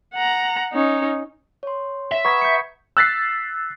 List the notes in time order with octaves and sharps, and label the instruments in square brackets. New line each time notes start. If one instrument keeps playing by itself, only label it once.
[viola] F#5 A#5
C#4 D#4
[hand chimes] C#5 C6
[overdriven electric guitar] E5
[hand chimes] B4 F#5 A#5 [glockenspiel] B5 D#6 G#6 [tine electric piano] C#6 B6
[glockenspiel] G6 C#7
[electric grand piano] E6 F#6 A6 B6 C7